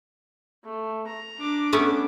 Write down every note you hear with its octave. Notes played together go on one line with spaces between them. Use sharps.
A3
A#5
D4 D6
A3 B3 C#4